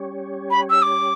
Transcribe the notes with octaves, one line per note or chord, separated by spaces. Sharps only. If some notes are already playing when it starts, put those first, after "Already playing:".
Already playing: G3 C#4 G4 C#5
B5
E6
D6